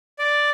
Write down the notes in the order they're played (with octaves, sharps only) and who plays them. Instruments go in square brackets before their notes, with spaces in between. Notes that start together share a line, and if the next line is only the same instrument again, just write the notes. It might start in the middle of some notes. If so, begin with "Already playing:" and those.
[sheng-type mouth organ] D5